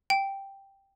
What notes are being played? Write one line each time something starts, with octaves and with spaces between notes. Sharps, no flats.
G5